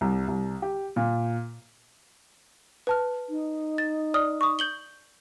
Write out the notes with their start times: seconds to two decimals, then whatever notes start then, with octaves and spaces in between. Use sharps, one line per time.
0.01 C2
0.28 C2
0.62 G4
0.96 A#2
2.87 B4 A5 F6
3.29 D#4
3.78 A6
4.14 D5 D#6 F6
4.41 C#6 D#6
4.59 G6 F#7 G7